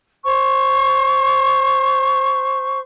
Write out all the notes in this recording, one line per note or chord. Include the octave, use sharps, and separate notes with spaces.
C5 C#6